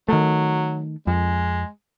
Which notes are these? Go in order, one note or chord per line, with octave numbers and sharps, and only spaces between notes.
D#3 F#3 A3
F2 G#3